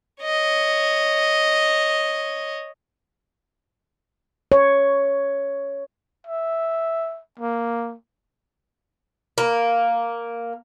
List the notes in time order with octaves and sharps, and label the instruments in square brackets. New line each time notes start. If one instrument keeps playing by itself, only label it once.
[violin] C#5 D#5
[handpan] C#5
[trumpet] E5
A#3
[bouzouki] A#3